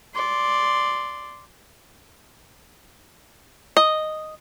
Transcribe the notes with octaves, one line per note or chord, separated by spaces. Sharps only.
D5 C6
D#5